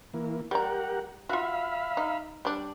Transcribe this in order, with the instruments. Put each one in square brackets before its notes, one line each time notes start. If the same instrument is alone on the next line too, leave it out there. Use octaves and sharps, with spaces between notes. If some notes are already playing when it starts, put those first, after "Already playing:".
[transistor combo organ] E3 A#3
[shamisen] G3 A#5 [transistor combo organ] G4 A#4 F#5
[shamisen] F4 F#4 [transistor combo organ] E5 F5 B5
[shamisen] D#4
G3 D4